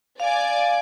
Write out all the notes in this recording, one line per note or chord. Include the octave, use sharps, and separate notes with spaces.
D5 F5 G#5 D6